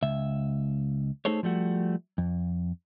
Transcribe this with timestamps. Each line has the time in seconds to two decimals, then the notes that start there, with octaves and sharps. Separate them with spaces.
0.02 C#2 E5
1.25 A3 D#4 G#4 A4 C5 C#5
1.43 F3 G3 A3 F#4
2.18 F2